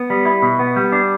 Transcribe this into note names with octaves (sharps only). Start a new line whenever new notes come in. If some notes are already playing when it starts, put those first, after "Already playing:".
Already playing: B3
G3
E4
B2
B3
G3
D4